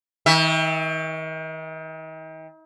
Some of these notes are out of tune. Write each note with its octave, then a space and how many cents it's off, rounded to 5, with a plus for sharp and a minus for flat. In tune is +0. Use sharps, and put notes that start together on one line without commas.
D#3 +40 E5 +0